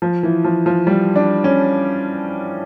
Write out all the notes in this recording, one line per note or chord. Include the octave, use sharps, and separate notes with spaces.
F3
E3
F3
F3
G3
D4
C#4